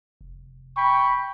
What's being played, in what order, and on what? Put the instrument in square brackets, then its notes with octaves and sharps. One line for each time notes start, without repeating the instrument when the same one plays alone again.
[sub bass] F1
[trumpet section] G5 B5 C#6